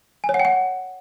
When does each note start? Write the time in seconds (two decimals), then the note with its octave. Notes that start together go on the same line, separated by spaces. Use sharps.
0.24 G#5
0.29 C#5
0.34 F#5
0.40 G5
0.45 F#5